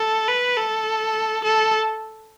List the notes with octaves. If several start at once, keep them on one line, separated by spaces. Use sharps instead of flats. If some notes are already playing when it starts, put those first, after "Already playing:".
Already playing: A4
B4
A4
A4